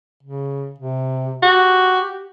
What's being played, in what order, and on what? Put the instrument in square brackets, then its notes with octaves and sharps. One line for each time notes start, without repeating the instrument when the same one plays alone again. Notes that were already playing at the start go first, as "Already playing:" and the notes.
[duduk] C#3
C3
[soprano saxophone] F#4 [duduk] G4